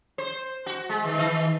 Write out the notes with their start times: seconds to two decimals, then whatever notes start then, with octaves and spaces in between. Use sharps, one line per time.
0.18 C5
0.66 F#4
0.89 G#3
1.05 D#3
1.19 D#3